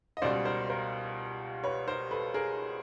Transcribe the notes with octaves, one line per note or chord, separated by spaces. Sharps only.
D#5
C#2 B2 G3 C5 D5
A#4 C5
A#4 C5
B4 C#5
A#4 C5
A4 B4
G#4 A#4